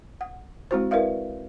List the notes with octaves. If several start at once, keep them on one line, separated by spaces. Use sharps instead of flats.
F#5
G#3 C4 E4 F#4 C5
E4 A#4 B4 D5 E5 F5